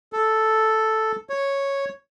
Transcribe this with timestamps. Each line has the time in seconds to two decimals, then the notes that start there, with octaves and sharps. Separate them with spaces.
0.13 A4
1.30 C#5